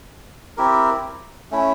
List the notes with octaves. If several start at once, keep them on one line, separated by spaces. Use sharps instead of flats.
C4 E4 G4 A#4
A3 C#4 E4